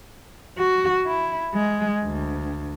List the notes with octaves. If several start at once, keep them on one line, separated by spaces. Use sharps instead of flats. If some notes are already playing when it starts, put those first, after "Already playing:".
F#4
E4
G#3
D2